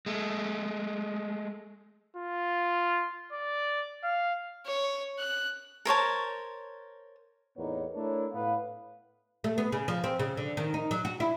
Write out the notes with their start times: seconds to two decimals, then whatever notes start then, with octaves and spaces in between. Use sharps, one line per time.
0.06 G#3 A3
2.16 F4
3.32 D5
4.04 F5
4.66 C#5
5.19 F#6
5.85 A#4 C5 C#5 A5
7.57 E2 A2 A#3 B3 D#4 C#5
7.95 A3 D4 E4 A#4 C#5
8.33 A2 B3 B4 F5
9.44 A3
9.58 B3
9.72 C#3
9.88 F3
10.04 C4
10.19 C#3
10.37 D3
10.57 D#3
10.74 D#4
10.91 F#3
11.05 F#4
11.20 E4